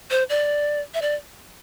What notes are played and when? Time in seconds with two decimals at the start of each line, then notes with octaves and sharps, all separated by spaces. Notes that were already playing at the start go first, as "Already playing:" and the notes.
0.11 C5
0.30 D5
0.94 E5
1.02 D5